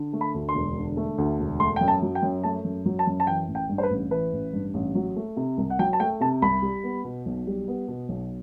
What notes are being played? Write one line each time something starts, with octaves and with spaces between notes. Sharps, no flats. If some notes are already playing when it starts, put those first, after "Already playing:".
Already playing: D3
A3
B5
D2
C6
E1
D3
A3
D2
E1
A3 C6
F#2 G5
A5
F#3
G5
F#2
A3 A5
F#2
F#3
A5
F#2
A5
E3 G5
A1
G5
G2
C5
B4
A1
E3 B4
A1
G2
A1
F#3
A3
C3
C2
F#5
F#3 G5
A5
A3 G5
C3 A5
C2 B5
G3
B3
B2
B1
G3
B3
B2
B1